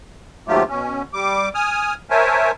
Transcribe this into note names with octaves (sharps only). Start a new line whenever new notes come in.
D#2 G#2 F#3 A3 F4 G4
B2 C#4
G3 D6
G#5 D#6 F6
A#4 C5 C#5 E5 G#5 A5